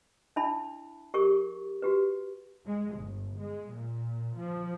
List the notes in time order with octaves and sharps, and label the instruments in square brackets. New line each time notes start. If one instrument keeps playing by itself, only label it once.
[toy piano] D4 E4 E5 A5 B5
G4 G#4 A#4 C#6
F#4 G4 B4
[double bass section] G#3
G1
G#3
A#2
F3